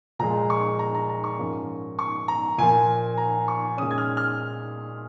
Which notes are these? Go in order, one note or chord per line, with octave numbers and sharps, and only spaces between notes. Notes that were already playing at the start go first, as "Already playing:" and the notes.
A#2 F3 G#3 A#5
C#6
A#5
A#5
A#5
C#6
G#2 F3 A#3 C#4
C#6
A#5
A#2 F3 A#3 G#5
A#5
C#6
A#2 G#3 C#4 D#6
G#6
F6
F6